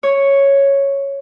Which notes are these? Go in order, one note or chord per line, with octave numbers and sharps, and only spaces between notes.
C#5